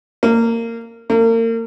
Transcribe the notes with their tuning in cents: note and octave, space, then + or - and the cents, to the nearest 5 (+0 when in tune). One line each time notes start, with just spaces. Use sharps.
A#3 -20
A#3 -35